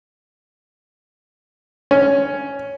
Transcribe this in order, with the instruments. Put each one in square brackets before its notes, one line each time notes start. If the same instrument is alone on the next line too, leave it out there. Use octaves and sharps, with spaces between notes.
[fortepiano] C#4